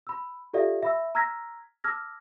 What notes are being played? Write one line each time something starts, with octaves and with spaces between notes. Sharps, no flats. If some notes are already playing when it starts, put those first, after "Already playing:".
B5 E6
F4 G4 A4 D5 E5 F5
E5 B5 E6
A#5 E6 F6 G#6 A#6 B6
A5 D6 E6 F6 G#6 A#6